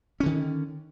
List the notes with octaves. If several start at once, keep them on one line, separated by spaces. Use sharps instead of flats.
D3 D#3 C#4